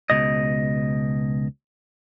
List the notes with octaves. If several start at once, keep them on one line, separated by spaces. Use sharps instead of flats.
C#2 B2 D#5